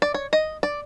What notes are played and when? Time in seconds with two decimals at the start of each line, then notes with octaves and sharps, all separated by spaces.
0.02 D5
0.14 C#5
0.33 D#5
0.63 D5